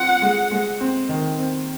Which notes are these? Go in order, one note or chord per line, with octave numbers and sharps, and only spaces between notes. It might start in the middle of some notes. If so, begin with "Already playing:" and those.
Already playing: C4 F4 F#5
G#3
G#3
C4
D#3
C4